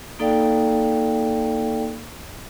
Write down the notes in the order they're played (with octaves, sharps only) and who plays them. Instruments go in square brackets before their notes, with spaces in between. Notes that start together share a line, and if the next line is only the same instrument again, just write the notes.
[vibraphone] A#3 D#4 A4 D5 F5 G5